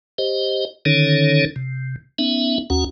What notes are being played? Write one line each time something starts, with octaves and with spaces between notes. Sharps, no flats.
G4 C5 D#5
D3 D#3 C#4 D#4 A4 C#5
C3
B3 C#4 D#4 E5
D#2 C#4 F#4 F#5